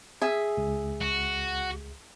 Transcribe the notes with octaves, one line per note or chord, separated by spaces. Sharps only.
G#4 E5
C#2
F#4